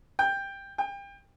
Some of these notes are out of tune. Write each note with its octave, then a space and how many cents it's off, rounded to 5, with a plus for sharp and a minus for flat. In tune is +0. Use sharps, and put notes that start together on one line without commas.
G5 +10
G5 +30